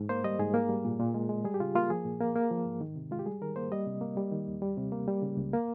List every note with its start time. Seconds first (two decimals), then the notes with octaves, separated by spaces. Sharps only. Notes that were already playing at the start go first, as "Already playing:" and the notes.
Already playing: G#2
0.09 A#3 C5
0.24 G3 D#5
0.39 G#2 G#4
0.54 A#3
0.69 G3
0.85 A#2
0.99 A#2
1.14 G#3
1.29 G#3
1.44 G3 G#4
1.54 G4
1.60 C#3 F4
1.75 A#3 F4
1.90 F3 G#4
2.05 A#2
2.21 A#3
2.36 A#3
2.51 F3
2.66 G#2
2.81 D#3
2.96 C3
3.11 G#3 F4
3.19 G4
3.26 G3 G#4
3.41 D#3 A#4
3.56 A#3 C5
3.72 G3 D#5
3.87 C3
4.01 A#3
4.17 G3
4.31 D#3
4.47 D#2
4.62 G3
4.78 C3
4.92 A#3
5.08 G3
5.22 C#3
5.37 C#2
5.53 A#3